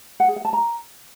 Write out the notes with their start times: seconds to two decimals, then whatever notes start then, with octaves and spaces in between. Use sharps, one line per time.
0.20 F#5
0.28 G#4
0.36 F#5
0.45 A5
0.53 A#5